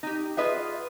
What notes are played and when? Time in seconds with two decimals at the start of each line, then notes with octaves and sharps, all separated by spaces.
0.03 D#4 G4
0.37 F4 G#4 B4 D#5 E5 F#5